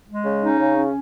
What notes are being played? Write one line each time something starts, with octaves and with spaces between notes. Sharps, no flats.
G#3
C#3
C#4 D#4
C#3
C#4